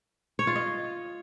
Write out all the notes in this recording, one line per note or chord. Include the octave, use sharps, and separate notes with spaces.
C#5
F4
D#5